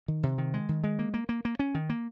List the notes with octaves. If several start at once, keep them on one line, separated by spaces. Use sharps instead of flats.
D#3
C3
D#3
G#3
D#3
G#3
A#3
A#3
A#3
A#3
C#4
D#3
A#3